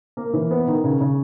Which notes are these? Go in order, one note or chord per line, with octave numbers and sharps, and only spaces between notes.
A#3
E3
B3
D#3
C#3
C#3